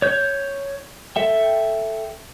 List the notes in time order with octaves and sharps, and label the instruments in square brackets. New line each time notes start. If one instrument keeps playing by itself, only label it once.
[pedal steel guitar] C#5 G6
A4 E5 G5